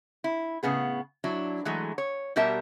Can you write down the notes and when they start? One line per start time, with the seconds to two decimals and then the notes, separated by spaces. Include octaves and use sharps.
0.24 E4
0.63 A2 C#3 B3 G#4
1.24 F#3 D4 E4
1.65 E3 F#3 G#3 A3
1.98 C#5
2.36 B2 G3 G4 A#4 E5 A5